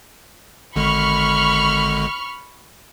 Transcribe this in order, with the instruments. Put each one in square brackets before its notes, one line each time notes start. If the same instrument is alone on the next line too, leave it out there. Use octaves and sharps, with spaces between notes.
[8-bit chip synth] G#1 D3 G#3 [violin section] B5 C#6 F6